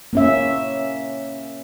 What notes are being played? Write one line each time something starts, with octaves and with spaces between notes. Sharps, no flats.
A#3 C#4 E5